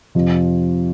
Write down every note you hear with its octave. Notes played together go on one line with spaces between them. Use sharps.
F2 C3 F3